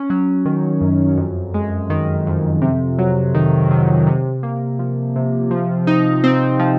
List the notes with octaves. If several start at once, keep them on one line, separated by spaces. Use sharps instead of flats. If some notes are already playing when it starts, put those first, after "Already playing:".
Already playing: C#4
F#3
D#3
F#2
F2
G#3
D#3
F2
C3
F#3
D#3
C3
C3
A#3
F3
C3
F3
D#4
C4
F3